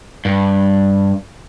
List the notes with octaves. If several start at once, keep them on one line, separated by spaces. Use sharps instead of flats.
G2